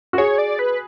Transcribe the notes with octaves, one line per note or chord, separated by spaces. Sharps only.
F#4
G#4 C#5
D5
B4